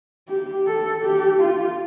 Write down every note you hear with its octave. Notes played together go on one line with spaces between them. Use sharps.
G4
A4
G4
F4